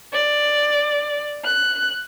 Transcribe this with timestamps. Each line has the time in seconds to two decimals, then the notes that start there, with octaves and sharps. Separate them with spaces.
0.12 D5
1.44 F#6